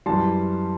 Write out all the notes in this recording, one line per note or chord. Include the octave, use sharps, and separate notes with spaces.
F#2 E3 G3 A5 C6